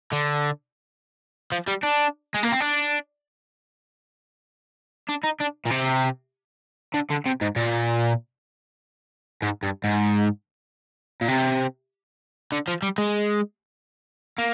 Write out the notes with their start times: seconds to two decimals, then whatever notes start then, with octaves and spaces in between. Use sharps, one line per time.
0.12 D3
1.52 F3
1.67 G3
1.83 D4
2.34 G#3
2.43 A#3
2.52 C4
2.61 D4
5.09 D4
5.23 D#4
5.40 D4
5.65 A#2
5.70 C3
6.94 D3
7.10 D3
7.26 C3
7.41 G#2
7.56 A#2
9.42 G#2
9.63 G2
9.84 G#2
11.21 A#2
11.28 C3
12.52 D3
12.68 F3
12.83 G3
12.98 G#3
14.39 A#3